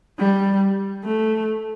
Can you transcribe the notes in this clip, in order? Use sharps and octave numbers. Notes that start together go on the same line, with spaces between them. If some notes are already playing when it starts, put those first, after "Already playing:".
G3
A3